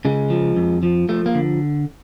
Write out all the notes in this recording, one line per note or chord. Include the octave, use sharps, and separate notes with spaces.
C#3 G#3
F3
F2
F3
F3 A3
A#3
D3